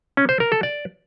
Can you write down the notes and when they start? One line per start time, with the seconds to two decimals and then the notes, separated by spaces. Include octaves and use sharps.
0.17 C#4
0.29 C5
0.40 A#4
0.52 A4
0.63 D5